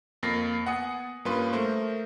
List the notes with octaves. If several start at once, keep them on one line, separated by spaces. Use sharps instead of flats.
F2 A#3 A6 A#6 C7
B3 F#5 G#5 D#6 C#7
G2 A#3 C#4 F4 B4 C6
A3 A#4 C5